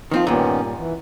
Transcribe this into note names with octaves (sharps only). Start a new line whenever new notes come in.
D#3 F3 C4 F4
G2 A#2 D#3 B3 C#4
E3